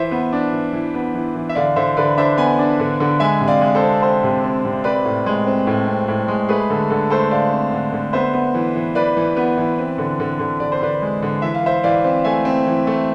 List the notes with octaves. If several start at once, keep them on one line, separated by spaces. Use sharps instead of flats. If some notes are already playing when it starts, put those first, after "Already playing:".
Already playing: E3 C5 E5
B3
D4
E3
E3
B3
E3
E3
E5
D3 D5 F5
D3 C5 E5
D3 B4 D5
D4 C5 E5
B3 G#5 B5
D4
D3
D3
G#3 E5 G#5
C3
D5 F5
G#3
A4 C5
C4
C4 A4 C5
C3
C4
C3
C4 B4 D5
A2
G#3
C4
A2
C4
A2
G#3
A3 G#4 B4
D3 A4
D3 A4
A3 A4 C5
D3 D5 F5
C4
D3
D3
B3 C5 E5
B3
E3
E3
E3 B4 D5
E3
B3
E3
C4
D3
D3
D3
D3 D5
C5
D3 B4 D5
G#3
D3
E3 E5
F5
E3 C5 E5
E3 D5 F5
C4
A3 E5 G#5
C4
E3
A3